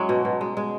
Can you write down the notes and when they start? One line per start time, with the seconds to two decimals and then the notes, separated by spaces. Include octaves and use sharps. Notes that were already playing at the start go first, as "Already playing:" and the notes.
Already playing: F#3 G#3 C#4 E4
0.09 B2
0.25 B2
0.41 G#3
0.57 G#3